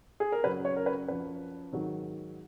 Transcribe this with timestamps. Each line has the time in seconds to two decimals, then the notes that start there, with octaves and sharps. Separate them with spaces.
0.20 G#4
0.32 A#4
0.43 F#2 C#3 F#3 B4
0.65 C#5
0.76 A#4
0.86 B4
1.08 F#2 F3 B4
1.73 G#2 D#3 F#3